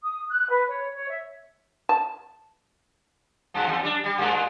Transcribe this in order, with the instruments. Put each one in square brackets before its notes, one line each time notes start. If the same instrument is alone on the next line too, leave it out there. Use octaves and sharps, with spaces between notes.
[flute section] D#6
F#6
B4
C#5
C#5
E5
[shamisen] A5
[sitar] G2 B2 G#3
E2
G3 D4
G3
G2 G#3 A#3
A#2 G#3